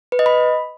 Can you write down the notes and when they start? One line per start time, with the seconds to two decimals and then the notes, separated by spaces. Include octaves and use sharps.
0.12 B4
0.19 D#5
0.26 B5